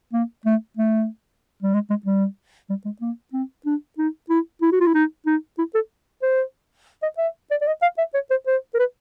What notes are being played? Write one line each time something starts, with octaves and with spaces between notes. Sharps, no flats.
A#3
A3
A3
G3
G#3
G#3
G3
G3
G#3
A#3
C4
D4
D#4
E4
E4
F#4
F4
E4
D#4
D#4
E4
A4
C5
D#5
E5
D5
D5
D#5
F5
E5
C#5
C5
C5
A#4
B4